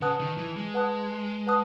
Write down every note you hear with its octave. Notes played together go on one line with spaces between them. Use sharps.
C#3 B4 F#5 A5 D#6 F#6
D#3
E3
G#3
B4 F#5 A5 D#6 F#6
B4 F#5 A5 D#6 F#6